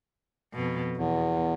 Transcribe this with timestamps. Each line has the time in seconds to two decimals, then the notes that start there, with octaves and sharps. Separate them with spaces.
0.54 F2 B2
0.97 E2 B2